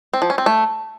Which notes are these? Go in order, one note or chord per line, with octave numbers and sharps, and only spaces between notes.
C4
F3
C#4
C4
A3